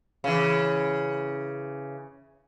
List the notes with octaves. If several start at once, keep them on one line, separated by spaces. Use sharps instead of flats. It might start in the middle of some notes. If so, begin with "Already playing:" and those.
C#3 E3